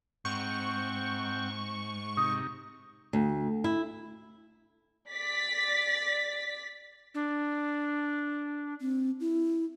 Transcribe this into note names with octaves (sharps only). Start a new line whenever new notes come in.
G#2 C4 F#5 G5 C#6
C3 D#4 D#6
D2
E4
D5 A6 B6
D4
C4
E4